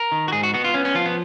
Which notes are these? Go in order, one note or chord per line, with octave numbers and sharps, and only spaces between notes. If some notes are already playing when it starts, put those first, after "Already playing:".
Already playing: A#4
D#3
F#4
G#2 G#4
F#4
B3 F#4
F4
B3 C#4
C#4
F3 F4
B3